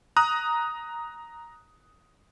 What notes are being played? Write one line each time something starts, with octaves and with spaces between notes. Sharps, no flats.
A#5 D#6 F#6